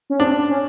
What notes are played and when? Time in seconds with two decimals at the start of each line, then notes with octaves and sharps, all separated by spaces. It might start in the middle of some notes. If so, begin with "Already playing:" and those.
0.10 C#4
0.19 C4 D4
0.49 C#4